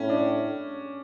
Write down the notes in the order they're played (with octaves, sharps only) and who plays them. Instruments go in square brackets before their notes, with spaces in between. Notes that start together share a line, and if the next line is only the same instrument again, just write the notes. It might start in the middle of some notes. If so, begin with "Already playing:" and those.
Already playing: [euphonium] A2 [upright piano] C#4
[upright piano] D4